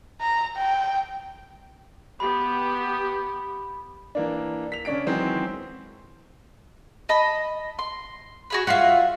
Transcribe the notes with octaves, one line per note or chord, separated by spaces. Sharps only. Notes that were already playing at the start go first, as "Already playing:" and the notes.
A#5
G5
B3 G4 B5
E3 A#3 D4
B6 F7
C#3 C#4 D4 B6 D7
D#3 E3 F#3 G#3 C4
D#5 A5 B5
C6
F#4 G#4 B5
F4 F#4 E5 F5